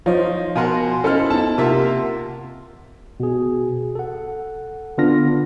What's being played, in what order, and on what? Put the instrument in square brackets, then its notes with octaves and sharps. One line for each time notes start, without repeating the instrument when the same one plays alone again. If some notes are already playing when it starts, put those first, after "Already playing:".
[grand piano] F3 [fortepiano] D#4 [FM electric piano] C5 C#5 F5
[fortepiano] B2 A#4 F#5 [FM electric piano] F5 G#5 C6
[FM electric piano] C#4 [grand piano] D#4 A4 [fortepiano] E4 C5 F6
[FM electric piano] B3 D#4 F4 [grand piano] A5
[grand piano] C3 [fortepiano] A#3 F4 E5 [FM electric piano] F#5 C6
[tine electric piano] B2 G#4
A4 F#5
D3 B3 D4 F4 F6 A#6